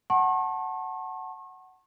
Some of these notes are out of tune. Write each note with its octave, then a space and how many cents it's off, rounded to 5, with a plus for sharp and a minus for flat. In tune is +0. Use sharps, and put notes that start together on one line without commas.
F#5 +10 A5 +0 C#6 -45